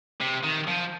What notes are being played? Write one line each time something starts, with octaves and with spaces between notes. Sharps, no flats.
C3
D#3
F3